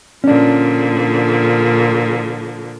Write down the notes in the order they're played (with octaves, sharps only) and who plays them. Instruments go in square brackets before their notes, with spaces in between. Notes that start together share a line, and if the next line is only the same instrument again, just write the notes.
[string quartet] A#2 D3 F3 [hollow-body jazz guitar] C#4 D4